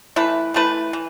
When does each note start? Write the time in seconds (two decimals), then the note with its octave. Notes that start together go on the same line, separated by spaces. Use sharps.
0.16 E3 A3 E4 B4
0.54 E3 A3 E4 B4
0.93 E3